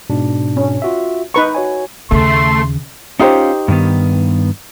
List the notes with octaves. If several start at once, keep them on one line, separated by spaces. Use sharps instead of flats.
G#2 B2 D4
C#4
F4 F#4 E5
D#4 B4 A#5 C#6
F#4 C#5 G#5
D#2 C#3 A3 C6
C#4 D#4 F4 G4 C5
G2 D#3 B3